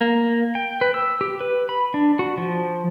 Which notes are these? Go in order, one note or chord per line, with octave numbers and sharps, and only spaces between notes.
A#3
G5
B4
E6
G4
B4
B5
D4
F#4
F3